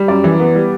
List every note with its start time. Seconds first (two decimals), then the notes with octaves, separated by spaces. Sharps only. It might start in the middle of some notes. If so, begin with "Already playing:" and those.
Already playing: G3
0.08 F#2 D5
0.24 E3
0.40 B3
0.55 G3